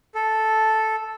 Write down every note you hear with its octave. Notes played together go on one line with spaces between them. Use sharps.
A4